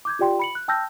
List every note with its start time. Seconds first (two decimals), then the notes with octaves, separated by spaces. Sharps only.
0.05 D6 G6 G#6
0.19 F4 G4 D5 G5 C6
0.39 B5 C#7 F#7
0.55 F#6
0.68 G5 A5 E6 F6 G6 A#6